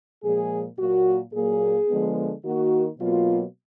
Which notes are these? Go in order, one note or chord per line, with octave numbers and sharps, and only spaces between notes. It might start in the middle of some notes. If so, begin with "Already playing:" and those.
A#2 F3 G#3 G#4
A#2 F#3 A#3 F#4
A#2 F#3 A#3 G#4
D3 F3 G#3 B3
D#3 A#3 F#4
B2 F#3 A#3 F4